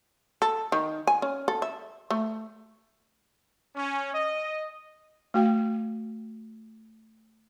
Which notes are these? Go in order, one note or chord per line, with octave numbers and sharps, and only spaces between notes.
A4
D#3
G#5
C#4
A4
E5
A3
C#4
D#5
A3 F#4 G5